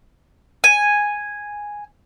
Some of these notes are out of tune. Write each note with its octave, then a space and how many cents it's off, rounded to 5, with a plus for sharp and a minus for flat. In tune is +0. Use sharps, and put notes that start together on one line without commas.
G#5 -5